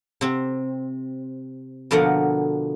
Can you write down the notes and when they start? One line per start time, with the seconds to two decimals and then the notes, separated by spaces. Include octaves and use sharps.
0.21 C3 C4
1.91 B2 D3 F3 A#3 F#5